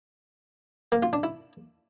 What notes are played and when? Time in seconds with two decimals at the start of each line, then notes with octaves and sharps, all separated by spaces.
0.92 A#3
1.03 F4
1.13 D4
1.23 E4